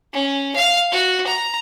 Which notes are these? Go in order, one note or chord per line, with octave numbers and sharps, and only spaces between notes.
C#4
F5
F#4
A#5